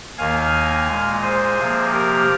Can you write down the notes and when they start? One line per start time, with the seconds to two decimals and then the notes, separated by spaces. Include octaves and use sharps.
0.17 D#2 D#3 A#3 F5 G#5
0.88 A#2 G#3
1.23 G#4 C5
1.57 C3 F3 A#3
1.92 G4 A#4